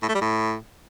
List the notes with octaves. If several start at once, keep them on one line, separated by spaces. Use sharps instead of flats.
A2
A3
G3
A2